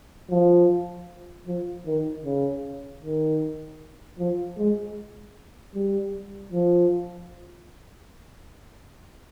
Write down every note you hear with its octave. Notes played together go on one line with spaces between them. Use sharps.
F3
F3
D#3
C#3
D#3
F3
G#3
G3
F3